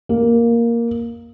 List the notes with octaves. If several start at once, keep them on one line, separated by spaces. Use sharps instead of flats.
A#3